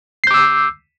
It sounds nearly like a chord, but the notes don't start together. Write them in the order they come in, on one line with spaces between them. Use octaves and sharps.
C7 G6 D6 E6